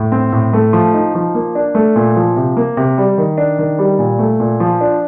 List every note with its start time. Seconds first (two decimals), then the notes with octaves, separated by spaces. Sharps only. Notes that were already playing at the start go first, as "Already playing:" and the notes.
Already playing: A2
0.12 C4
0.32 A2
0.53 A3
0.73 F3
0.93 D#4
1.15 F3
1.35 A#3
1.55 D4
1.75 A3
1.96 A#2
2.16 F3
2.36 C3
2.57 A#3
2.77 C3
2.98 G3
3.18 D#3
3.38 D4
3.59 D#3
3.79 G3
3.99 A#2
4.19 A3
4.40 A#2
4.60 F3
4.81 D4